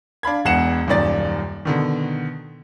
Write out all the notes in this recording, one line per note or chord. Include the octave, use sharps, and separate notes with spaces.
D4 F5 B5 G#6
E1 E2 F#5 C7 C#7 E7
D#1 F#2 A#2 D#3 D5 A6
B2 D3 D#3